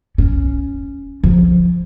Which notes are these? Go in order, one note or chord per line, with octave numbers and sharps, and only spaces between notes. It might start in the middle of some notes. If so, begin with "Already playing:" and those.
C#4
F3